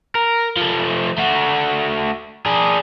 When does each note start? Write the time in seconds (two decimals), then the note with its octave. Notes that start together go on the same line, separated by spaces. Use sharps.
0.15 A#4
0.57 F3 A3
1.18 A3 F#4
2.46 D4 G#4